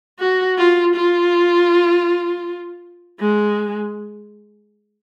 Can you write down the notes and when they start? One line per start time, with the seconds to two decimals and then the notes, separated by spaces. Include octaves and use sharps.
0.20 F#4
0.58 F4
0.96 F4
3.20 G#3